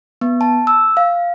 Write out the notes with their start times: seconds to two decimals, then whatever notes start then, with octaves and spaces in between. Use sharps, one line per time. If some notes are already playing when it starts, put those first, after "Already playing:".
0.21 B3
0.41 A5
0.67 E6
0.97 F5